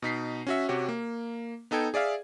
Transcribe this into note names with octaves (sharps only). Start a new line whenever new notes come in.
B2 D#4 B6 C7
C#4 F#4 E5
C3 F#4 G4 C#5
A#3
B3 D#4 A4 G5 G#6
G#4 D5 E5 F5